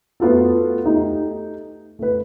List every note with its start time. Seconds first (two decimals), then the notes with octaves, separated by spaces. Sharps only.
0.20 A3 B3 F4 F#4 A4
0.84 A3 D#4 G4
1.99 A3 B4